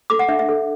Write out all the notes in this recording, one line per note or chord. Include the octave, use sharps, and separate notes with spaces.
A4 D6
F#5
D4 E5
E5
A4